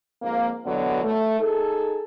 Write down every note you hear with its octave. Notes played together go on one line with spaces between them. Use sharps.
F2 G#2 A#3
B2 D3 E3 F#3 B3
A3
D#4 G#4 A4